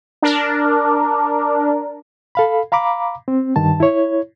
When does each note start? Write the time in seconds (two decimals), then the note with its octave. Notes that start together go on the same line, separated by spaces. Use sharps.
0.22 D4 A#4
2.35 A4 F5 B5
2.72 F5 A#5 B5 D6
3.28 C4
3.56 G2 D#3 A5
3.80 E4 C#5